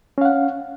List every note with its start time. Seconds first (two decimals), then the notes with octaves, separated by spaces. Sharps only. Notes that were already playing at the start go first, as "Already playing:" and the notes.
0.18 C#4
0.21 F5
0.25 F#5